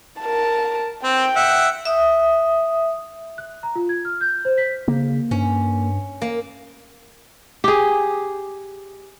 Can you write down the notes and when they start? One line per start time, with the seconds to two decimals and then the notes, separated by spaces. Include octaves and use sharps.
0.21 A#4 A5
1.04 C4 G5
1.36 E5 F#5
1.85 E5 D#6
3.38 F#6
3.63 A#5
3.76 F4
3.89 G#6
4.05 F6
4.21 G6
4.45 C5
4.58 B6
4.88 C#3 A#3
5.31 G2 C#4
6.22 A#3
7.64 G4 G#4